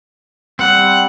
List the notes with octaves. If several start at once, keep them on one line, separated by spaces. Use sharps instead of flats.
G3 C4 F#5